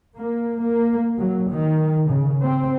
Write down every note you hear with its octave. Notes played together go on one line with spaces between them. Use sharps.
A#3
A#3
F#3
D#3
C#3
C4